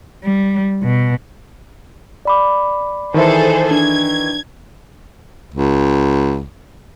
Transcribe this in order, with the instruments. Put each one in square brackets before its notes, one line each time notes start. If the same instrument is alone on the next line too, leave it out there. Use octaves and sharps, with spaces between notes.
[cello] G3
B2
[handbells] D5 B5 D6
[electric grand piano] D#3 E3 E5 [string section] G#4 A4 C5
[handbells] D4 B4 [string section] G#6
[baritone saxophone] C#2